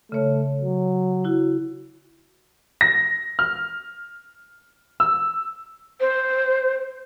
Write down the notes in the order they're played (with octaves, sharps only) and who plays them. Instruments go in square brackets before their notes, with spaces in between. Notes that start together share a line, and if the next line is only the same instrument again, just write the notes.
[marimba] C#3 C#5 [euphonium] A3
[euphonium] F#3
[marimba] E4 F#4
[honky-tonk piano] A#6
F6
E6
[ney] C5